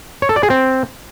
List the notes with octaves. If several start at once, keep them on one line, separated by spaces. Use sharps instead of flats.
C#5
A4
D5
G#4
C4